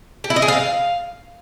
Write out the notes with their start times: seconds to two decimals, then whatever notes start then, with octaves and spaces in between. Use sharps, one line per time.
0.24 G4
0.30 E4
0.36 D#5
0.42 G#4
0.48 F5